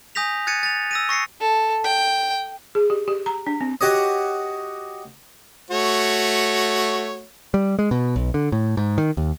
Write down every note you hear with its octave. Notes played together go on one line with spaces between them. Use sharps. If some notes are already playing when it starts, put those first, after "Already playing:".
G#5 D#6 G6 A#6 B6 F7
F#6 G#6 A6 C#7 D#7
A6 F7
E6 A#6 D#7
C#6 A#6 C7 C#7
A4
G5
G#4
G4
G4
A#5
D4
C4
F#4 G4 C#5 D#5
A3 F#4 C#5
G3
G#3
B2
B1
D3
A2
G#2
D#3
D#2